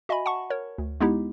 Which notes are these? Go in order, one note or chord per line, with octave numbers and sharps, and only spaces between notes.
F#4 D#5 E5 G#5 B5
F#5 A5 C#6
A#4 C#5
D2
G#3 B3 D#4 E4 G4